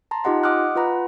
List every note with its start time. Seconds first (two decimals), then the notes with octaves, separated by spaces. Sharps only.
0.11 A5 A#5 C6
0.24 D#4 F4 G4 D#5 F#5 C6
0.44 D#5 F#5 D6 D#6 F6 F#6
0.76 F4 B4 F#5 A#5 B5